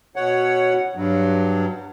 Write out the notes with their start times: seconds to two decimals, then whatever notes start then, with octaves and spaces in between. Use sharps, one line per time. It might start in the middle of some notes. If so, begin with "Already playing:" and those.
0.16 B2 C#5 F#5
0.96 G2 F#3